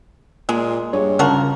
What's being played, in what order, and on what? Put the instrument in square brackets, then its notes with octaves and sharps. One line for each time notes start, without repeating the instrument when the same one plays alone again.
[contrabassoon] A#2 [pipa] G#3
[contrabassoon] G2 [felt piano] G#4 C#5
[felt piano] C#3 [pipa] F3 F#4 A#4